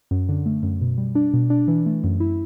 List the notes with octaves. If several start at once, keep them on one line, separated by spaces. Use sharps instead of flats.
F#2
D3
A3
F#2
B2
G3
D4
B2
D4
E3
A3
F#2
E4